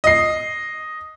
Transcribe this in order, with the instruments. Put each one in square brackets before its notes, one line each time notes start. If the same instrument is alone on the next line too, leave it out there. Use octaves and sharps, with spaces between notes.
[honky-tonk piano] D#5 C7